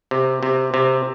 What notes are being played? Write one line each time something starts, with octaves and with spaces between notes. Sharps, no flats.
C3
C3
C3